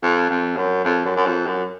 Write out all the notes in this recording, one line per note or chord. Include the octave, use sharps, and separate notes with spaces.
F2
F2
F#2
F2
F#2
F#2
F2
F#2